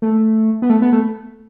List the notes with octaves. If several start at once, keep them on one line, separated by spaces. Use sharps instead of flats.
A3
B3
A3
B3
A3